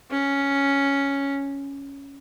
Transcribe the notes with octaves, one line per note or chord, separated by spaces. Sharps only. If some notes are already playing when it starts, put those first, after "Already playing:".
C#4